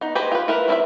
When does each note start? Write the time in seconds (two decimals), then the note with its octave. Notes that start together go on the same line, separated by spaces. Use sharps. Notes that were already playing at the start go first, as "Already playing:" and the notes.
0.01 B3 D#4
0.15 G4 G#4 B4 C5 D#5
0.32 F4 B4
0.48 E4 A#4 B4
0.68 C4 D#4 E4 B4 E5